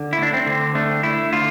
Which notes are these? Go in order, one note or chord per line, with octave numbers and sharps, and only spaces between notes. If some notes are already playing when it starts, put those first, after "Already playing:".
Already playing: D3
E4
A3 D4
C4
D3
A3 D4
A3 E4
D3 F4